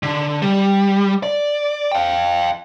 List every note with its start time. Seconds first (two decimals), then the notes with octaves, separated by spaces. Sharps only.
0.03 D3
0.42 G3
1.23 D5
1.92 F5 G5